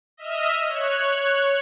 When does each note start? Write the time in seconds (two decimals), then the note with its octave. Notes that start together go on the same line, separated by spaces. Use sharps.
0.17 D#5 E5 E6 F6
0.66 C#5 F#6